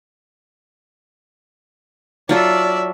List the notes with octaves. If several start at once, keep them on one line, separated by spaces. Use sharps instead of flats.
F#3 F4 A4 D5 E5